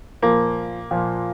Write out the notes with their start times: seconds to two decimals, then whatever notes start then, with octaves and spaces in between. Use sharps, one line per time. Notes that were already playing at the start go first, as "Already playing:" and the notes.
0.23 A#2 F3 A#3
0.91 A#2 F3